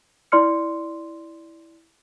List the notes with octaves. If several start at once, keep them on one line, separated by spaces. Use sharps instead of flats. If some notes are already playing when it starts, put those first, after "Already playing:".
E4 D5 C6 F6 C#7